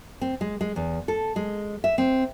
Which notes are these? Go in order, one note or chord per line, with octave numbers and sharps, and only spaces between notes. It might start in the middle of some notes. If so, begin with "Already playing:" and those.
C4
G#3
G#3
E2
A4
G#3
E5
C4